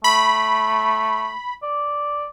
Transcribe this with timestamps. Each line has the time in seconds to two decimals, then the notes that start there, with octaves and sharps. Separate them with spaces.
0.04 A3 B5
1.63 D5